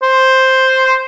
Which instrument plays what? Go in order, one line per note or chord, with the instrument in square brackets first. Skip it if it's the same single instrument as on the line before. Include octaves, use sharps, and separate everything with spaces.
[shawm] C5